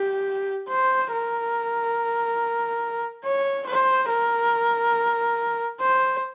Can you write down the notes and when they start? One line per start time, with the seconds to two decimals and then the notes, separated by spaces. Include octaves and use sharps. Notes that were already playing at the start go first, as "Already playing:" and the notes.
Already playing: G4
0.69 C5
1.12 A#4
3.25 C#5
3.66 C5
4.09 A#4
5.80 C5